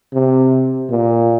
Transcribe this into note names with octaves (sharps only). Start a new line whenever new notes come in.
C3
A#2